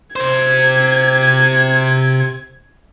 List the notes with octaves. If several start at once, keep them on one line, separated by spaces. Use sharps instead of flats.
C3 C5 G#6